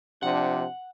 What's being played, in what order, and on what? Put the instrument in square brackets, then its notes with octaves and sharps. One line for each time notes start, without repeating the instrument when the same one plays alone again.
[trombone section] C3 F3 D4 [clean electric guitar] F#5